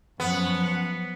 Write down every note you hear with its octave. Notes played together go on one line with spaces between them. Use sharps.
F#2 F3 B3 F#5 F#6